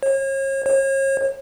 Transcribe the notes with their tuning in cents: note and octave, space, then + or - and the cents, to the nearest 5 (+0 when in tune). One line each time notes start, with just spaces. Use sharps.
C#5 -40
C#5 -40